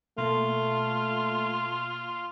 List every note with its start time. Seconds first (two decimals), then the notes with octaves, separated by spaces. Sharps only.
0.18 B2 A3 A#3 F4 A5